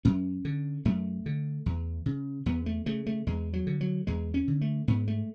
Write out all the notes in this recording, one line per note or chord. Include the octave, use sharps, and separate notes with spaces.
F#2 C#4
D3
F#2 A3
D3
E2
C#3
E2 B3
A3
C#3 A3
A3
E2 G#3
F#3
D3
F#3
E2 G#3
C#4
D3
A3
G#2 B3
A3